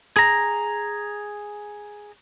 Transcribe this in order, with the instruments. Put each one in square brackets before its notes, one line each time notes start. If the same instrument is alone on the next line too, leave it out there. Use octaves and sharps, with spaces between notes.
[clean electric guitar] G#4 A#5